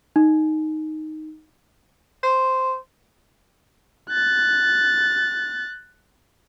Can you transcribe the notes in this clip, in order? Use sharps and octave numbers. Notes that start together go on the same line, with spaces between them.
D#4
C5
F#6 A6